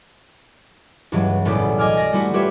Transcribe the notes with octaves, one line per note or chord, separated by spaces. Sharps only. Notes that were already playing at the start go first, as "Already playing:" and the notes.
C#2 G2 E3 F#3
F#1 B1 A2 C#3 D5
D#5 G#5 D6 F6
D5 A#6
G3 A3 C4 E4 F#4
G3 F4 G4 B4 C#5 E5